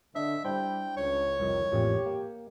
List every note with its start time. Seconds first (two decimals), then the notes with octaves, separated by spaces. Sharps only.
0.15 D3 D4 D#5 E5
0.45 G3 D4 E4 C5 G5
0.97 C#2 C#5
1.40 C2 F2 D#3
1.72 A1 F2 A#2 G4
2.06 A#3